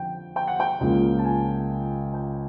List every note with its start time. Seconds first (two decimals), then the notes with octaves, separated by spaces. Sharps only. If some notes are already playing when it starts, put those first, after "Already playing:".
Already playing: F2 D3 G5
0.36 G5
0.48 F#5
0.60 G5
0.81 C#2 C#3 F3 A#3
1.19 A5
1.25 G#5
2.14 G5